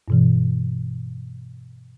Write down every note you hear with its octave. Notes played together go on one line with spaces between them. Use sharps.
G2 B2 E3